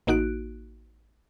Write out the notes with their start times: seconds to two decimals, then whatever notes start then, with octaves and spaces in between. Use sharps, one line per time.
0.07 A1 A#3 D#4 F#4 F#6 D7